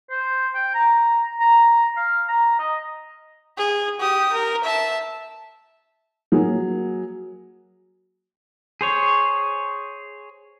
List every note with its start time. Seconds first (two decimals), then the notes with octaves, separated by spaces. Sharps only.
0.11 C5
0.55 G5
0.74 A#5
1.40 A#5
1.97 F5
2.28 A#5
2.59 D#5
3.58 G#4
4.00 G4 D#6
4.33 A#4
4.64 E5 A5
6.32 F#3 A#3 G#4
8.81 G#4 C5 C#5